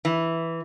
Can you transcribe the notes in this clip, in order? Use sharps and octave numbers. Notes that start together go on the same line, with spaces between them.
E3